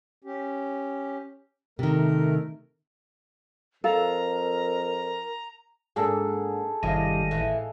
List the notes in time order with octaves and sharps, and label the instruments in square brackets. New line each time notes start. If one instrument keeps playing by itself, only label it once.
[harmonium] C#4 G4
[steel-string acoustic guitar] C3 D#3 [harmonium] A3 A#4
[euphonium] F2 [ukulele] A4 F5 [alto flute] A#4 [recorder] A#5
[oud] G#2 A#3 D4 [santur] G#4 A4
[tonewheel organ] G1 D#3 [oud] G2 C3 E4 [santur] D#5 F5
[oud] A2 E3